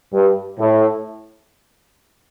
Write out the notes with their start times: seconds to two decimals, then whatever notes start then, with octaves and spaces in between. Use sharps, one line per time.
0.13 G2
0.58 A2